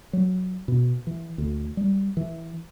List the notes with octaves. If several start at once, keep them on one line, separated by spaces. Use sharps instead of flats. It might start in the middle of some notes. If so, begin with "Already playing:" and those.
F#3
B2
E3
D2
G3
E3